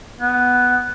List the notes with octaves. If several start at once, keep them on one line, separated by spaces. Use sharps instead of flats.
B3